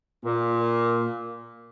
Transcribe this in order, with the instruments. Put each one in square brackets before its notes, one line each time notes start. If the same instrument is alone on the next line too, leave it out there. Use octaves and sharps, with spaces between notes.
[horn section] A#2